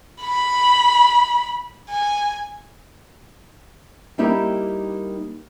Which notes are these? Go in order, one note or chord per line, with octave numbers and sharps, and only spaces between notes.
B5
G#5
G3 A#3 D#4 E4 G4 A#4